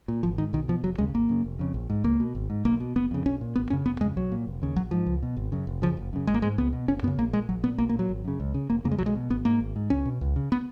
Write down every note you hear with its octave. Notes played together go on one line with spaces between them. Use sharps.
A#2
G#1 F3
G#2 D#3
B1 D#3
B2 F3
F1 F#3
D#2 C#3 G#3
G#1 A#3
F#2 C#3
F1
F2 C#3
A#1
G#2
C#2 A#3
B2
G#1
G#2
B1 A#3
B2
F#1 B3
F2 C#3
B1 C#4
A#2
G#1 B3
F#2 C#3 C#4
F1 B3
F2 C#3 G#3
B1 F#3
A#2
F1
D#2 C#3
A#1 F#3
G#2 F3
C#2
B2
G#1
F#2 C#3
F1
F2 C#3 F3
F#1
F#2 C#3
G#1 G#3
A#3
G#2 G#3
C#2 B3
B2
F#1 C#4
F#2 C#3 B3
A#1 A#3
A#2 G#3
A#1 F#3
A#2 B3
B1 A#3
A#3
A#2
F#3
G#1
F#2 C#3
C#2
C#3
F1 A#3
F2 C#3 A#3
G#3
B1 F#3
G#3
B2
G#1 B3
G#2 A#3
G#1
G#2
C#2 C#4
B2
C#2
C#3
B3